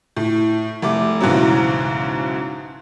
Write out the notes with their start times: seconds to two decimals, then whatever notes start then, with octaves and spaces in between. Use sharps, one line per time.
0.17 A2
0.82 F1 A3 D6
1.20 B1 G#2 C#3 E3 F#3